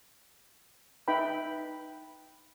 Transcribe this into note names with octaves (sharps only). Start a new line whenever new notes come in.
D#4 B4 E5 G5 B5